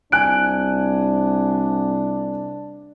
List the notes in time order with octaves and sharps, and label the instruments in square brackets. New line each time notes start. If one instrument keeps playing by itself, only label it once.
[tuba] C2 [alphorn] D4 [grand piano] G#5 F#6 D7